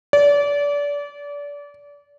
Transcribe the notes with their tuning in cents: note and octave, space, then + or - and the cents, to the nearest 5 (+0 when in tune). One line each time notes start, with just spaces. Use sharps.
D5 -30